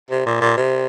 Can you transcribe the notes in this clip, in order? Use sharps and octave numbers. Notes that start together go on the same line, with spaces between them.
C3
A#2
A#2
C3